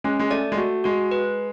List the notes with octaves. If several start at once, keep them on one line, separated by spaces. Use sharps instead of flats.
G#3 C#4
G#3
A3 D5
G#3
A3 F#4
G#3 F#4
B4